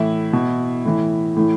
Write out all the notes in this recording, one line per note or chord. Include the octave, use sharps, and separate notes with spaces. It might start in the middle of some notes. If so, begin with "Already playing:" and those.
Already playing: A2 E3 E4
B2
A2 E3
A2 E3